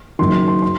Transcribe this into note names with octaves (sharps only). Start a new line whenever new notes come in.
F#1 F#2 D#3 C6
C6
C6